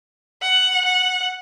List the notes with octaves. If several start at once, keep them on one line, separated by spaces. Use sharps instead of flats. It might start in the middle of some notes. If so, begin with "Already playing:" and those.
F#5
F#5